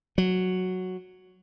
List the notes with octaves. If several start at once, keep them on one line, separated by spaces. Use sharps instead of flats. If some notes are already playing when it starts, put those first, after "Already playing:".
F#3